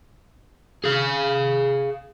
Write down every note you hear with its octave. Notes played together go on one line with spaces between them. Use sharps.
G#4 F5